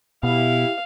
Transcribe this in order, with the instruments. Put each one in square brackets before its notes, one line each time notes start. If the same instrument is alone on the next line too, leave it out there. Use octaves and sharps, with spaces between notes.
[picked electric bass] B2 [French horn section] E4 G4 [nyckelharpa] F5